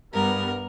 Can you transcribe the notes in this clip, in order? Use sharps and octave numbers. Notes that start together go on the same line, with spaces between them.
G2 G3 B3 A#4